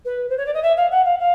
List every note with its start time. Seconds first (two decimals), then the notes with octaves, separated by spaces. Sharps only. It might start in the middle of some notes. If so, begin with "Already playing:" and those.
0.05 B4
0.29 C5
0.37 C#5
0.45 D5
0.53 D#5
0.62 E5
0.76 F5
0.91 F#5
1.05 F5
1.19 F5